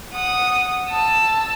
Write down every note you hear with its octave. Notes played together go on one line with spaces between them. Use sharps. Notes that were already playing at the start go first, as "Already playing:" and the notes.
F#5 D#6
A5 E6